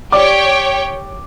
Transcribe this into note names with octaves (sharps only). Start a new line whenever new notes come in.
G4 C#5 D5 G5 D6